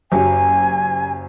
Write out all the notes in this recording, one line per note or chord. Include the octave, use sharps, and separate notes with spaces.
F#1 F#3 G4 G#5